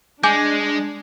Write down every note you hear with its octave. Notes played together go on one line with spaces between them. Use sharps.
G#3 D4 G#5 D6 G6